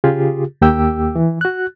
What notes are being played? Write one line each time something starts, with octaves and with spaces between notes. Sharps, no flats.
C#3 F4 G4 G#4
D#2 A#3 G4 G5 E6
E3
F#4 F#6